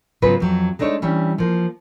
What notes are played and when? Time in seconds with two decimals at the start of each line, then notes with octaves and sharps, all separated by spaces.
0.22 G#2 C#3 F#3 B3 F4 B4
0.40 F2 F#3
0.79 G#3 A3 D4 D#4 C#5
1.02 E3 G3 C#4 D4
1.38 F3 A#3